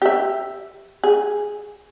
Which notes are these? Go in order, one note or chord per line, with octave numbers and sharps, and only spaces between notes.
G4 E5
G#4